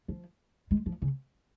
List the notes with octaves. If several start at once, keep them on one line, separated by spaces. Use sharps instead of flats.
F3
G#3
F3
C#3